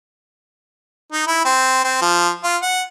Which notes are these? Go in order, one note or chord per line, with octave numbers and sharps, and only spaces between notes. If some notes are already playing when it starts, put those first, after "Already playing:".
D#4
E4
C4
C4
F3
F4
F#5